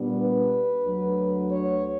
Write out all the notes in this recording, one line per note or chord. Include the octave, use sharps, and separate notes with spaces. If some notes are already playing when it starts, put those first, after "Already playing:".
Already playing: A#2 G3 B3 D4
B4
D2 D3 F#3
C#5